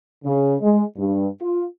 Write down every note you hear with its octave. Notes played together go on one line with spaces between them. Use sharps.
C#3
G#3
G2
F4